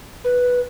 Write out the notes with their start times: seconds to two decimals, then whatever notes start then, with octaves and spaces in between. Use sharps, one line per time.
0.25 B4